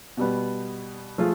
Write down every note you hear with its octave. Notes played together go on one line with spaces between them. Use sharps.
B2 G3 B3
F3 A3 F4 G#4